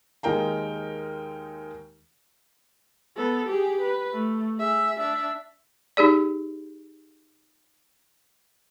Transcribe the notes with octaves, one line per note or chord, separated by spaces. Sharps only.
D#2 G#3 D#4 A#4 G5 A#5
B3 A4
G4 G#4
B4
A3
G#4 E5
D4 E5
D#4 G4 G#4 D5